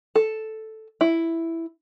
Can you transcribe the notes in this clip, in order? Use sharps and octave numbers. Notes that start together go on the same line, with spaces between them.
A4
E4